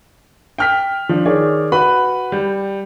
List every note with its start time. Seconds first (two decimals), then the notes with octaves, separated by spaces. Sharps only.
0.58 G5 F6 B6
1.09 F3 D4
1.26 D#3 G#4 C#5 D5
1.72 F#4 B4 B5
2.32 G3